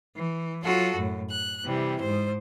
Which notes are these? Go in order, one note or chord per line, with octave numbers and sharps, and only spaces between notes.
E3
F#3 F4 F#4 A4
F#2 A2
F#6
C3 E3 G3
G#2 C5